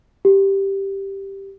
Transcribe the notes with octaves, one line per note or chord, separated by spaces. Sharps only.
G4